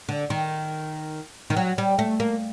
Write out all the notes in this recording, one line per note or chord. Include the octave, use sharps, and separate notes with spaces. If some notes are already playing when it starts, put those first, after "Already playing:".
D3
D#3
D#3
F#3
G3
A3
A#3